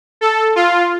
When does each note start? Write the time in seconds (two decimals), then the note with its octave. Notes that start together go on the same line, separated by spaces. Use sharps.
0.21 A4
0.56 F4